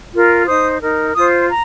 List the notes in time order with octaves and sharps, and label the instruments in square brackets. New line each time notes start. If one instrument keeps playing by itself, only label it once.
[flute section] F4 A#4
D#4 C5 D#6
D#4 A#4
F4 C5 D#6
A#5